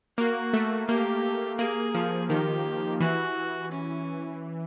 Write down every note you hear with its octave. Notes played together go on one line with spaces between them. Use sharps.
A#3 F#4
A3
A#3 G4
A#3 G#4
F3
D#3 G4
E3 F#4
C#4